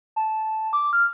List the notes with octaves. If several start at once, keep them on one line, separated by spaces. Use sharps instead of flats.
A5
D6
F6